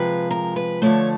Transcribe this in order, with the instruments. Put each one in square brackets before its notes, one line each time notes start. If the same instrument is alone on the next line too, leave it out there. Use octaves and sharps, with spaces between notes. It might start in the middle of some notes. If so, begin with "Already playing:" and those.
Already playing: [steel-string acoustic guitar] C3 F3 G#3 B4
A#4
B4
D3 F3 A3 C#5